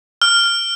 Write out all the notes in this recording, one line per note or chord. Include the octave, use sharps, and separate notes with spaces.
F6